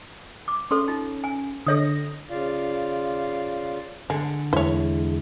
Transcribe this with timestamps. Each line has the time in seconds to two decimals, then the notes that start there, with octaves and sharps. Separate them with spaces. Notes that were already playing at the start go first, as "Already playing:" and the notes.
0.48 D6
0.71 C#4 A4 C6 C#6
0.88 D#4 F4
1.24 G#5
1.67 D3 A4 C#5 D#5 D#6 A#6
2.30 C#3 F4 D5 F5
4.10 D3 G#3
4.53 E2 G#3 E4 C5 C#5